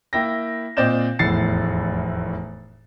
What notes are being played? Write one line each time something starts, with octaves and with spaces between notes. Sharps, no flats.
A#3 E4 G5 A#6
A#2 C4 D5 D#5 G6 E7
F1 E2 A2 A6 C7 C#7